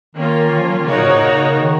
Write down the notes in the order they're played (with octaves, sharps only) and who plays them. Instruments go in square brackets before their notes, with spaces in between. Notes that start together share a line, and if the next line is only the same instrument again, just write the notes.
[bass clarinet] D#3 [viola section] A#3 C#4 F4
[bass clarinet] D#3
F3
F#3
D#3
[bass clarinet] C#3 [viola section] A#3 D#4 F#4 A#4 C#5
[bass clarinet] A#2
G#2
A#2
C#3
D#3